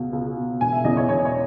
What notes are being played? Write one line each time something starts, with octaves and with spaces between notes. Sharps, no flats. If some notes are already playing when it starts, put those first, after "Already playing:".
Already playing: C#2 B2
C#2
B2
E1 G#5
E5
E2 C#3 E3 D#5
C#5
E1 C#5
C#5